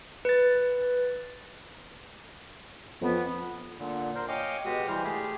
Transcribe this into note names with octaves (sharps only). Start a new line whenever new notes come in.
B4 A6
F2 B3
A#2 D3
A#4 C5
C#5 D#5 F5 G5 G#5 D6
B2 G#3 F#4 G4 D#6
E3 G3 C5 F6
A3 G4 G#4